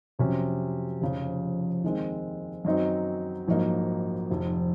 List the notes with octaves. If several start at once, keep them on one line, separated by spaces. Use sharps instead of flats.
F2 C3 F#3 C#4
F1 F2 C#3
D#2 D#3 G#3 C4
F#2 D#3 F#3 C4 D#4
A#1 G#2 F#3 A#3 D#4
F1 F2 D#3